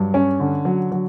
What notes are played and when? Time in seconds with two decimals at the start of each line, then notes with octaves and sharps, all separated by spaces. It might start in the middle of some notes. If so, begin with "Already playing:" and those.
Already playing: G2 F#3
0.14 C#4
0.40 D3
0.65 F#3
0.91 F#3